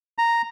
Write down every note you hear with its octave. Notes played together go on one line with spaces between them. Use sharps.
A#5